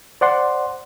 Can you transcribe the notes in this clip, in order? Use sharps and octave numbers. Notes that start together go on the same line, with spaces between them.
C5 D5 F#5 C6